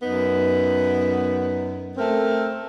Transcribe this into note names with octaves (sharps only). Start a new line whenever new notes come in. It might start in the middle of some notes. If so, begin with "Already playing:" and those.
F#2 B3 D#4
A3 C4 A#4